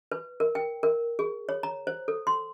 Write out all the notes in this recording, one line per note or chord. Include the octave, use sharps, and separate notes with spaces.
B4
A#4
G5
A#4
G#4
C#5
A#5
C5
A4
C6